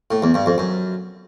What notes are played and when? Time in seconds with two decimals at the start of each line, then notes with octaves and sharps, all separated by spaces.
0.11 A2
0.22 E2
0.34 G2
0.46 F2
0.58 F#2